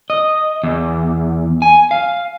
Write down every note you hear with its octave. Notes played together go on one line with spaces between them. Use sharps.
D#5
E2
G#5
F5